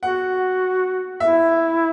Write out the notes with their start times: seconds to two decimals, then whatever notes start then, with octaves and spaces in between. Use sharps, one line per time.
0.02 F#4 F#5
1.20 E4 E5